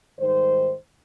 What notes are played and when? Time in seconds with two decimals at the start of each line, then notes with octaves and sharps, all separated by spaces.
0.19 G#2 D#3 G3 C5